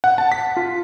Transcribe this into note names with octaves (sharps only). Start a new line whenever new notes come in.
F#5
A5
B6
F4